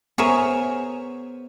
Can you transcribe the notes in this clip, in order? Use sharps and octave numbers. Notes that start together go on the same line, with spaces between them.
B3 G#4 A#4 C5 C#5 E5 G#5 A#5